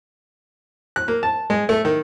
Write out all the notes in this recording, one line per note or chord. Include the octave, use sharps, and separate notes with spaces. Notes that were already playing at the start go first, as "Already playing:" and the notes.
F#6
A#3
A5
G#3
A3
D#3